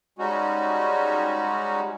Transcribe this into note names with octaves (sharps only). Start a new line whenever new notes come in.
G3 G#3 C#4 D#4 F#4